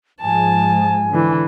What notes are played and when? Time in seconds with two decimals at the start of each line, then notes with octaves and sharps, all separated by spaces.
0.21 G#2 F3 G#3 G#5 A5
1.11 D3 E3